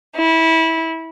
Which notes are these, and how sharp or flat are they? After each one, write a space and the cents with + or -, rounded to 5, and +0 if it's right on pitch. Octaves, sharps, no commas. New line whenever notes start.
E4 -20